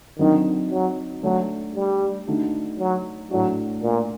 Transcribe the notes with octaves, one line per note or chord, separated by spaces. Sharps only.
D3 D#3 F#3 C4 D#4
F#3
D3 F#3 A3 D4
G3
D3 A3 D#4 F#4
F#3
A2 F#3 A3 D4 F#4
A#2